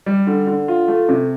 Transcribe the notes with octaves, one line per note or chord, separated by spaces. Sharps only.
G3
D3
D3
F4
A3
C3